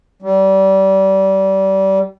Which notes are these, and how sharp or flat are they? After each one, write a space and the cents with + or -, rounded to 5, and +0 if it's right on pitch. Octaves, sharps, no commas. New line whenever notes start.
G3 -25